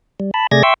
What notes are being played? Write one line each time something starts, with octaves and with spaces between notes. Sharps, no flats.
G3
A5 B5
C3 A3 G#4 D5 G#6 A#6
E5 G5 C6 C#6 E6